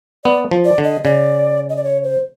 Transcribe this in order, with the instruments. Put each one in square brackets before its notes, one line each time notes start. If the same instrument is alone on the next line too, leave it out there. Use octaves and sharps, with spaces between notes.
[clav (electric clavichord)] B3 [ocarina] D5
[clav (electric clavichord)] F3
[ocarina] D5
[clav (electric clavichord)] D3
[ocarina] D#5
[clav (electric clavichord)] C#3 [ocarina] D5
[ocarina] D#5
D5
C#5
C5